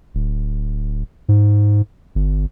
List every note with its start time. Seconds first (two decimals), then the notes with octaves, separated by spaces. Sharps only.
0.15 D1
1.29 G#2
2.15 G1